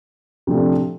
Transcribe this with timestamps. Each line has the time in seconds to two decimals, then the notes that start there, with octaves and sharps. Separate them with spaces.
0.47 C3 F3 A3 D4